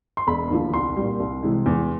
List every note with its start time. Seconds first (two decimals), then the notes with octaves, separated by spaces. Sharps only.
0.17 C6
0.27 E1 B5
0.51 D#2 D3 F3
0.73 C2 C6
0.97 A#2 G3
1.20 C2
1.43 C3 E3 G#3
1.66 E2